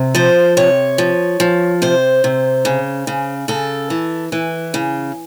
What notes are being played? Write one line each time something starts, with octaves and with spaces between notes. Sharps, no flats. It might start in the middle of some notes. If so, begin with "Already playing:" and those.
Already playing: C3
F3 C5
C3 C#5
F3
F3
C3 C5
C3
C#3
C#3
C#3 A4
E3
E3
C#3